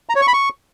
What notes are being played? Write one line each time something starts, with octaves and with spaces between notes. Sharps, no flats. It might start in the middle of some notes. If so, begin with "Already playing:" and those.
A#5
C#5
C#6
B5
C#6